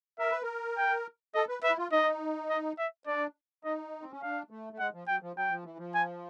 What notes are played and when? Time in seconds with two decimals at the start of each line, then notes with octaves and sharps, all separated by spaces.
0.19 A#4 E5
0.31 B4
0.43 A#4
0.78 G5
1.35 A4 D#5
1.49 B4
1.63 B4 E5
1.70 E4
1.78 F4
1.92 D#4 D#5
2.50 D#5
2.79 E5
3.07 D4 D5
3.64 D#4 D#5
4.02 C4
4.12 C#4
4.22 D4 F5
4.50 A3
4.73 A3
4.79 G#3 F#5
4.94 F3
5.08 F#3 G5
5.22 F3
5.37 F#3 G5
5.50 F3
5.64 E3
5.78 F3
5.95 G#5